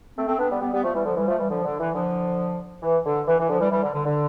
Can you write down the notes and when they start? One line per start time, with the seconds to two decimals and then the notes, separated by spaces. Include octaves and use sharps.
0.17 A3 C4
0.28 A3 C4
0.39 B3 D4
0.50 G3 B3
0.61 G3 B3
0.72 G3 B3
0.83 F3 A3
0.94 E3 G3
1.05 D3 F3
1.16 E3 G3
1.28 F3 A3
1.39 E3 G3
1.49 D3 F3
1.65 D3
1.79 E3
1.94 D3 F3
2.82 E3
3.05 D3
3.27 E3
3.39 E3
3.49 D3 F3
3.60 E3 G3
3.71 E3 G3
3.83 D3
3.94 D3
4.05 D3